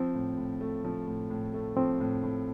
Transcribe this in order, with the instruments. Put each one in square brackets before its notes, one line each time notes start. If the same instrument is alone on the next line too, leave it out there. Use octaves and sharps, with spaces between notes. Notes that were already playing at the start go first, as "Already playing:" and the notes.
Already playing: [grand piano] F3 [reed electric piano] C4
[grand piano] A2
A2
A3
F3
A2
A2
A3
[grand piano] F3 [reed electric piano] C4
[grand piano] A2
A2